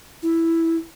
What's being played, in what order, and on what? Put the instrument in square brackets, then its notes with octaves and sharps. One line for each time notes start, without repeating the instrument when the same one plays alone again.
[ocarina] E4